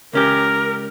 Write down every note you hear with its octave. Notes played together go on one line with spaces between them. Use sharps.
C#2 C#4 G4 A#4